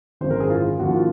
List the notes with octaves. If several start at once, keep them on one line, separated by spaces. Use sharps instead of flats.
G#1 F#2 D#3 C5
A#4
G#4
F4
D#2 C#3 F3 F#4
F4